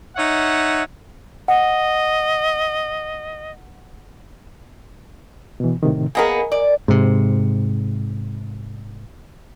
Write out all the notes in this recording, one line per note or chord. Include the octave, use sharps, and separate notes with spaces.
D#4 C#5 E5 F#5
D#5 F#5
B2 E3
A2 C3 D#3
A#3 B3 G#4 A#4 D#5 G#5
D5
G#2 C3